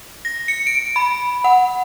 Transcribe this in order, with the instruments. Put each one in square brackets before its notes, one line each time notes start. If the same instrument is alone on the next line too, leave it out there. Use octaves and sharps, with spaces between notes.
[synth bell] A#6
C#7
D7
B5
F#5